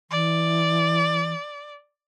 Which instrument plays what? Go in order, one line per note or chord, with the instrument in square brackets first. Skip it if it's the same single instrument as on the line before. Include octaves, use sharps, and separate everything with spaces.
[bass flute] E3 [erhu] D5